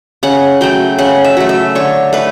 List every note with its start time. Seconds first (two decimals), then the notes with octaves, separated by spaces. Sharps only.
0.23 C#3 F#5
0.61 F#3 A3 G5
0.98 C#3 F#5
1.24 E5
1.37 F#3 A3
1.49 E5
1.75 D3 C#5
2.13 A3 B4